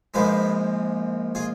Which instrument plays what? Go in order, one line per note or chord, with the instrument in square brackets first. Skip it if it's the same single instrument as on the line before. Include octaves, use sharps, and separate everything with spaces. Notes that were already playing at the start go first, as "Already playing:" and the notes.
[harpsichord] A#1 G#2 F3 G#3 G#4 B4
F4 G#4